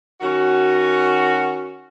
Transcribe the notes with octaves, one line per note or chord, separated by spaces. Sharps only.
D#3 C#4 F#4